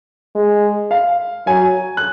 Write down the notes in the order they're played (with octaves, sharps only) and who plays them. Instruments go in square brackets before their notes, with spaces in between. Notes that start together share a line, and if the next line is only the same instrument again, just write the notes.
[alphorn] G#3
[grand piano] F5
[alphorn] F#3 [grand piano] G#5
[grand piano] F#6